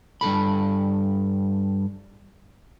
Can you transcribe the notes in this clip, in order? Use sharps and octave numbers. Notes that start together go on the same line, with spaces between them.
G2 A#2 A4 B5